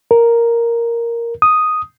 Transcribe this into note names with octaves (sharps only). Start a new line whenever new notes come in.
A#4
D#6